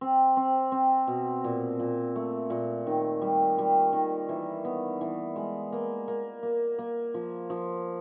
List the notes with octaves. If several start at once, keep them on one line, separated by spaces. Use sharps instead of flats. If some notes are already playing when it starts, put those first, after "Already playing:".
C4
C4
C4
B2
A#2
A#2
A3
A#2
D#3
G3
G3
D#3
E3
B3
E3
G#3
A#3
A#3
A#3
A#3
F3
F3